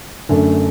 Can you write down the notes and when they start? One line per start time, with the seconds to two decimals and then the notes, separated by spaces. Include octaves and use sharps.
0.29 F#2 D3 A3